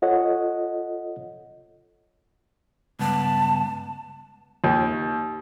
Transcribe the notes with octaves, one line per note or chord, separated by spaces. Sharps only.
F4 A4 C#5 D#5 F#5
C#2 G2 B3 A5
D#2